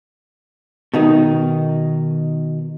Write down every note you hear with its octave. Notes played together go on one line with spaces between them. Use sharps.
B2 D#3 D#4